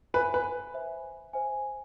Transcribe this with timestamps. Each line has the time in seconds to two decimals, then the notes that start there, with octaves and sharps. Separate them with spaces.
0.14 B4 C5 E5 G#5
0.34 B4
0.74 C5 E5 G#5
1.33 C5 E5 G#5